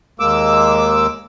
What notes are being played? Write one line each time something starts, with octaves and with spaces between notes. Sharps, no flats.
D#2 G#3 A#3 D6 E6